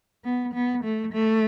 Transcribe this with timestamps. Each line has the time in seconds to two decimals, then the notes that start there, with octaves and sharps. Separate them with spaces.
0.25 B3
0.54 B3
0.84 A3
1.13 A3